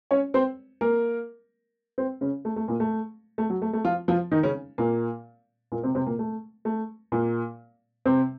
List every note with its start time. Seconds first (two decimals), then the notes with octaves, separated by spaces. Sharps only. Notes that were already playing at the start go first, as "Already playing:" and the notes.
0.11 C#4 C#5
0.34 C4 C5
0.81 A#3 A#4
1.98 C4 C5
2.21 C#3 C#4
2.45 A3
2.56 A3
2.68 A#2 A#3
2.80 A3
3.38 A3
3.50 F#3
3.62 A3
3.73 A3
3.84 F3 F4
4.08 F3 F4
4.31 D#3 D#4
4.43 C#3 C#4
4.78 A#2 A#3
5.72 A#2 A#3
5.83 C3 C4
5.95 C3 C4
6.07 A#2 A#3
6.19 A3
6.65 A3
7.12 A#2 A#3
8.06 C3 C4